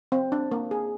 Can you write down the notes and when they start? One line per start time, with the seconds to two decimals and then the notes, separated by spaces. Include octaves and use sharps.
0.12 C4
0.32 D4
0.51 A#3
0.71 G#4